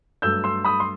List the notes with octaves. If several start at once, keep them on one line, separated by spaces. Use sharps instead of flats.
G2 F#3 A3 E6 G6
C6 E6
B5 D#6
C6